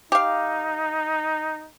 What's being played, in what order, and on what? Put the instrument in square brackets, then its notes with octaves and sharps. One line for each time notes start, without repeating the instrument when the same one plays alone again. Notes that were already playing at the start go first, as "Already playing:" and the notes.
[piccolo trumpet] D#4 [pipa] G4 F5